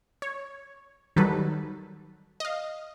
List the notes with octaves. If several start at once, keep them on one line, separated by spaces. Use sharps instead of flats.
C#5
D#3 F#3 G3 A4 B4
D#5 F5